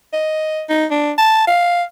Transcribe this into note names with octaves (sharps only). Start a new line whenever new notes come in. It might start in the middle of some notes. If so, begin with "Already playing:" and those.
D#5
D#4
D4
A5
F5